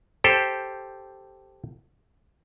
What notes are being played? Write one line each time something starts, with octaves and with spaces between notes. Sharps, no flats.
G4 A4 C5